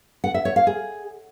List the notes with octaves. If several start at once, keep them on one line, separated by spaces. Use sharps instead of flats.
F#5
E5
C#5
F5
G#4